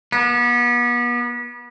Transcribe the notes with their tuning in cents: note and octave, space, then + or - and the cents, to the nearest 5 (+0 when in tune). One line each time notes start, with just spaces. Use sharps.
B3 -35